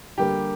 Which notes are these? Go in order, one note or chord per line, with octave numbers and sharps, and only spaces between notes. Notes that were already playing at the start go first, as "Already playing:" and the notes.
D3 G3 A#3 G4